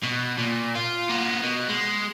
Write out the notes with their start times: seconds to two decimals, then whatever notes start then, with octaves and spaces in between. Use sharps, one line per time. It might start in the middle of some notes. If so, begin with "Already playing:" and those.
0.04 B2
0.38 A#2
0.75 F4
1.09 A#3 B3
1.43 B2
1.68 G#3